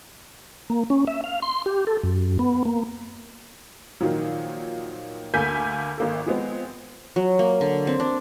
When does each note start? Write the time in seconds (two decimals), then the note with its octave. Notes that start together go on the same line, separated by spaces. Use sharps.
0.70 A#3
0.90 C#4
1.07 E5
1.24 F5
1.42 C6
1.66 G4
1.87 A4
2.03 F#2
2.39 B3
2.65 A#3
4.01 A#2 D#3 F3 F#3
5.34 D2 A#3 A4 G#5 G6 B6
5.98 G#1 A#3 A4
6.26 F3 G#3 B3 C4
7.16 F#3
7.39 A#3
7.61 D3
7.87 C4
8.00 D4